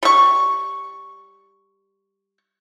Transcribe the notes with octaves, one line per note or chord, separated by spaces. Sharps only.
G3 C#6